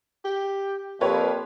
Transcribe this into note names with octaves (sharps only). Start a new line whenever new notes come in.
G4
F2 A#3 G4 B4 C#5